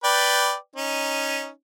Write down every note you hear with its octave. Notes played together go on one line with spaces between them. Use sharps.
B4 D5 G5
C#4 D#4